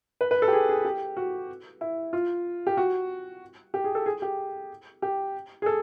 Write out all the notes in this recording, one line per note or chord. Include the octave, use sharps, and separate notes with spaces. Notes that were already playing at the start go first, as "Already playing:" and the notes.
B4
B4
A4
G4
G#4
G#4
G4
F#4
E4
F4
G4
F#4
G4
G#4
A4
G#4
G4
G4
G#4
A4